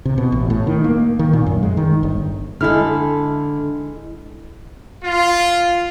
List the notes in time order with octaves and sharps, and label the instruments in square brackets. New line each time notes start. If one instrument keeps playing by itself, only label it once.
[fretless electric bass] C3
B2
A1
A2
D#3
A#3
D#3
A#2
F#2
G#3
D#3
G1
[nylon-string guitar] D3 A4 [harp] G#3 E4 F6
[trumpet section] F4